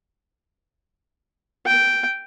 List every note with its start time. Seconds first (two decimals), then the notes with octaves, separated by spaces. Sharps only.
1.66 G5